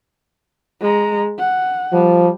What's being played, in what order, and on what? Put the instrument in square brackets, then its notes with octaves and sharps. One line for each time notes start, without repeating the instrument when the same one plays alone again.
[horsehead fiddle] G#3 A#5
F#5
[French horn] F3 [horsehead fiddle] G3